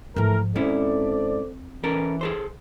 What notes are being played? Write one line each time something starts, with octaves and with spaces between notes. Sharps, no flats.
G#2 E3 F3 A3 A#4
G#2 C4 C#4 E4 A4 C5 D5
E3 C#4 A4 A#4
G#4 A4 C5